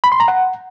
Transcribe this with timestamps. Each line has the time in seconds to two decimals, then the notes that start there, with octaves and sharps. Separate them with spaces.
0.04 B5
0.12 C6
0.20 A#5
0.28 F#5